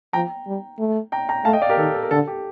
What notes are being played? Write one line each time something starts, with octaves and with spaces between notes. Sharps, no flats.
F3 G5 A#5
G3
A3
G5 A#5
G5 A#5
A3 F5 A5
D#5 G5
D5 F5
G4 A#4
D#3 A4
A4
A#4
D3 A4
G4